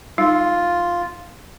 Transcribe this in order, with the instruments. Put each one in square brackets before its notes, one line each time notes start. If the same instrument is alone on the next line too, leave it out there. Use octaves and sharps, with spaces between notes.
[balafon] G3 D#4 [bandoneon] F4